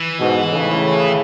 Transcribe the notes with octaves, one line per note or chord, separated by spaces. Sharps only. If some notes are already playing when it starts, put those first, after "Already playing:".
Already playing: E3
G#2 B2
A2 C#3